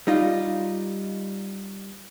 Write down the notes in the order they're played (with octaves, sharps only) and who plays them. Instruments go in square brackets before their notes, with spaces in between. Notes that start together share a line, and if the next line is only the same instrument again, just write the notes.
[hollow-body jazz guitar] G3 D#4 F4